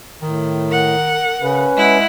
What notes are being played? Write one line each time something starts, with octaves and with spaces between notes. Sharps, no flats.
A2 D#3
A#4 F#5
C#3 C#4 B4
G#3 E4 F#5